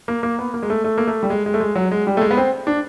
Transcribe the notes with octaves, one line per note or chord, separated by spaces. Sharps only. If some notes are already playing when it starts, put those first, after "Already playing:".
A#3
A#3
B3
A#3
G#3
A3
A3
A#3
A3
G3
G#3
G#3
A3
G#3
F#3
G#3
G3
A3
G#3
B3
C4
D4